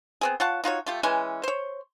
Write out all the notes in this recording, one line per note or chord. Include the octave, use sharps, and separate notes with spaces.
B3 C4 G#4
F4 C#5 F#5 A5
D#4 F4 F#4 C#5
A3 F4 G4
E3 G#3 C#4 G#5
C5 C#5